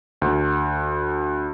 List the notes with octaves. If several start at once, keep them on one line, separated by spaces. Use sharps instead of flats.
D2